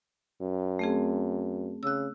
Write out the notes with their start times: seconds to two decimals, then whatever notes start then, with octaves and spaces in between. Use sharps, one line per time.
0.42 F#2
0.79 A3 C4 G#4
1.83 C#3 E6 F#6